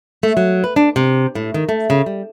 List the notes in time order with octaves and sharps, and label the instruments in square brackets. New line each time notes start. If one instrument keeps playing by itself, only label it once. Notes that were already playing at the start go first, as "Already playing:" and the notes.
[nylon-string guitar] A3
F#3
B4
D4
C3
A2
D#3
A3
C#3
G3